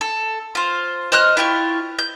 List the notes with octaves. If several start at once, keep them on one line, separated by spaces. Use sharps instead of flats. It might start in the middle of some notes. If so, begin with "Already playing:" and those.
A4
F4 C5
C5 D#5 F6 F#6
E4 F4 G4 C#6
G6